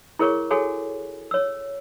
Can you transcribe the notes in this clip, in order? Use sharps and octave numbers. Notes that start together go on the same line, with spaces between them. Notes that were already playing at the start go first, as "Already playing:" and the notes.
E4 G#4 A#4 C#5 C#6
F#4 G#4 A4 C#5 F#5 G#5
C#5 E6